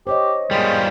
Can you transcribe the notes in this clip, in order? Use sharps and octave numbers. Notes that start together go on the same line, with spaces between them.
G4 C5 C#5 D#5
G3 G#3 F4 A#4